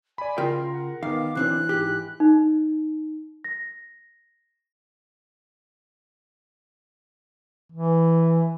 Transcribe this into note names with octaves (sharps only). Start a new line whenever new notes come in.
D5 G#5 B5
C#3 F4 A#4 G5 C6
F#5
D#3 B3 F5 D6
B1 E3 C4 D4 F#6
G#2 G4
D#4
A#6
E3